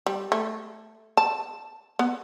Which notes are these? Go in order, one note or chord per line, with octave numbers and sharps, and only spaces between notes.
G3
A3
A5
B3